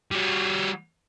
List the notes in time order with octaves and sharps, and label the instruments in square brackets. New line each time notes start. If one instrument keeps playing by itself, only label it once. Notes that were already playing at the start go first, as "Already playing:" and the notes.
[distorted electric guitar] G3 F#4